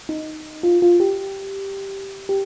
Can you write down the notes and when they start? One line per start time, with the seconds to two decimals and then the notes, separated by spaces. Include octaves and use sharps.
0.09 D#4
0.63 F4
0.82 F4
1.00 G4
2.29 G4